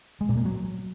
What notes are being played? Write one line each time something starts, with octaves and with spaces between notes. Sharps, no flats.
G#3
A#2
A#3
F#3